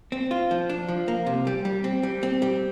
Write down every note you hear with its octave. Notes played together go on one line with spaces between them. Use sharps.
C4
F4
F3
D4
F3
A#3
C3
G3
G3
C4
G3
C4
G3